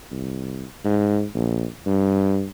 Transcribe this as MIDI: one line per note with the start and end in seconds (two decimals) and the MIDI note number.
0.12 0.65 36
0.85 1.25 44
1.35 1.66 34
1.86 2.47 43